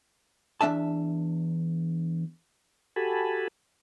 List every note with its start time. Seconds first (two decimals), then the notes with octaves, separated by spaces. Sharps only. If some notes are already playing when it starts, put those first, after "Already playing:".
0.61 E2 G#3 D4 E5 A5
2.96 F#4 G4 A4 G#5 A5 B5